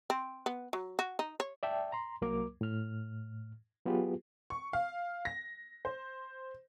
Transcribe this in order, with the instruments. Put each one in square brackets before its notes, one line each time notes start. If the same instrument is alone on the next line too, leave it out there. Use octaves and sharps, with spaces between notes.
[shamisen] C4
B3
F#3
F#4
D#4
C#5
[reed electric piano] D5 E5 G5 A5
A#5 C6
C2 F#3 A#3 A#4 D6
A2 F6
F#3 B3 F4 G4 G#4 B4
[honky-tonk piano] C#6
F5
A#6
C5